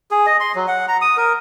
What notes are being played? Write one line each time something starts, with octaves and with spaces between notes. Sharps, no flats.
G#4
D#5
C6
F#3
F#5
A#5
D#6
A#4